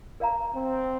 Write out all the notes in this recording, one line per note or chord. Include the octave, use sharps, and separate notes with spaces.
A#4 D5 F5 A#5
C4